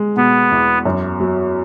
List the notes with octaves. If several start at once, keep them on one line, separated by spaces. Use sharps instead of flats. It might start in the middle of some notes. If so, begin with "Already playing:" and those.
Already playing: G#3
B2 B3
E2
F#2
F#3